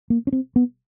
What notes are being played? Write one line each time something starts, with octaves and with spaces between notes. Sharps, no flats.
A#3
C#4
C4
B3